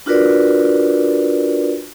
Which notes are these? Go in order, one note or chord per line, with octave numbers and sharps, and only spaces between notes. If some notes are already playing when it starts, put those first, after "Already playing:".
D4 F4 F#4 A#4 B4 D5